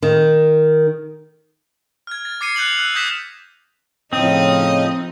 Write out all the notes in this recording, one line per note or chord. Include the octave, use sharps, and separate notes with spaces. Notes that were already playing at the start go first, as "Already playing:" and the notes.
D#3
F6 G#6
A6
D6 A6 C7 C#7 D#7
F#6 G6 F7 F#7
E6 F#6
D#6 G6 A#6 B6 E7 F7
A2 C#3 F3 C4 D#4 D#5